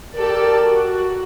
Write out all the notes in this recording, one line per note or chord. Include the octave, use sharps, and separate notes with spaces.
G4 A4 A#4 D5
F#4